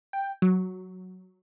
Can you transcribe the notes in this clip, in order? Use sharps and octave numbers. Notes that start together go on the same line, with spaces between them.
G5
F#3